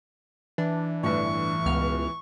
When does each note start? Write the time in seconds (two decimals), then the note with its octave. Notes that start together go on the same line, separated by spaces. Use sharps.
0.58 E3 D4
1.03 G1 A2 C#6
1.65 C#2 B2 F6